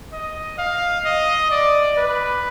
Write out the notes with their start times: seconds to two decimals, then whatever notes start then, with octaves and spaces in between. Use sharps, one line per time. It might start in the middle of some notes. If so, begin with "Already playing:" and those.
0.13 D#5
0.58 F5
1.05 D#5
1.51 D5
1.97 B4